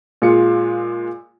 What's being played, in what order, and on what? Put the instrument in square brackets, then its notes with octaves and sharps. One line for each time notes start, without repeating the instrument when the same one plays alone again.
[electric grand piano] A#2 G#3 F4 C#7